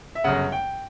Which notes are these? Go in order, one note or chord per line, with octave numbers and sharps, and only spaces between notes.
E5
G1 F#2 C#3 F#5
G5